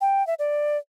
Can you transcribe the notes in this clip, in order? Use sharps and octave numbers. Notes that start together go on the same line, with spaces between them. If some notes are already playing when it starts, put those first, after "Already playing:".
G5
E5
D5